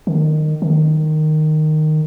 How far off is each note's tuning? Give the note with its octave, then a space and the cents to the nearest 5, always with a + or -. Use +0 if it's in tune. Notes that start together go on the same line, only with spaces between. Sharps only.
D#3 -20
D#3 -10